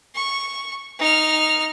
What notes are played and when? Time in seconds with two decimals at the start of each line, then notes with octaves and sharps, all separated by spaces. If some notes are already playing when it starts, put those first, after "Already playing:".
0.15 C#6
0.99 D#4 F6